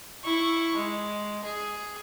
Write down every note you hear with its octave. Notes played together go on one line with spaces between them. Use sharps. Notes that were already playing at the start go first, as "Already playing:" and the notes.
E4 C#6
G#3
G#4